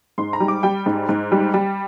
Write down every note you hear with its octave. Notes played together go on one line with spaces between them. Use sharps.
G#2 C6
A#5
G3
D6
G3 G5
G#2
G#2
G3
G3